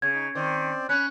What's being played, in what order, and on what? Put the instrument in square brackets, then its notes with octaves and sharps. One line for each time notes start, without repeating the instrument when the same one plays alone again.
[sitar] C#3 [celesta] G#6
[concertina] D#4
[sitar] D#3 [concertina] C4 C5 D5
[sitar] C#4 [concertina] C#5 B5 [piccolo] F#6